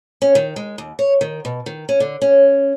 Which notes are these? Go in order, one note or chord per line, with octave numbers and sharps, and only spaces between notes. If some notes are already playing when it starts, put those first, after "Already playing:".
C#4
D#3
G#3
D#2
C#5
D#3
B2
D#3
C#4
D3
C#4